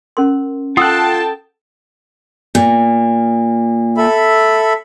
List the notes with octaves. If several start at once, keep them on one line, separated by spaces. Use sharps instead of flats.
C#4 A#4 C6
F4 A4 F#5 G5 A5 D#6 E6 F#6
A#2
A4 E5 B5